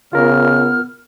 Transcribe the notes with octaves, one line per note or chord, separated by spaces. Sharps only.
C#3 B3 F4 A#4 F6